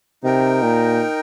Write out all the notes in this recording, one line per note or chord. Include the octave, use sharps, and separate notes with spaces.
C3 D#4 A#4 G5
A#2